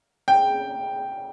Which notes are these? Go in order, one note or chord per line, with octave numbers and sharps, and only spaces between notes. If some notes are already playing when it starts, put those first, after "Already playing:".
G5